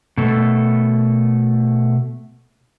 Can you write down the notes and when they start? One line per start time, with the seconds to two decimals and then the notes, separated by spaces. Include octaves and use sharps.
0.18 B2 A3